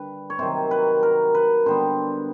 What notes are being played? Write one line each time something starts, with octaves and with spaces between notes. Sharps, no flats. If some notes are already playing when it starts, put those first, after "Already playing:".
Already playing: D3 G3 B4
C#5
C3 D#3 F#3 C5
B4
A#4
B4
D3 G3 B3 C5